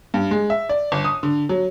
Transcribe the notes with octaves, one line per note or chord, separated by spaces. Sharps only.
G2
G#3
E5
D5
G1
D#6
D3
F#3